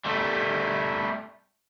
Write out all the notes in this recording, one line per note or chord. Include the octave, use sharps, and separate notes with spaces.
G3 A3